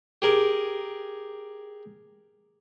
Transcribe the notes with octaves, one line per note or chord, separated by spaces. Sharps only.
G4 G#4 A#4